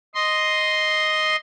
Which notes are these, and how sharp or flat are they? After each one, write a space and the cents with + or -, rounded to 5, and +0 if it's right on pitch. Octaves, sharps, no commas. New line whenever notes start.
D#5 +0 C6 +0